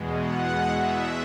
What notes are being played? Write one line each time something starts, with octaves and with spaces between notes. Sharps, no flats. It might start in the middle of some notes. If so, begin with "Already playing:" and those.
Already playing: E2 B2 G#3
F#5
E5